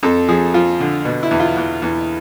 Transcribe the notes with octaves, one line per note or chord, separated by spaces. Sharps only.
F2 A4
F3 G#4
F3 F4
D3
B2
E4
E2
F4
E2
E2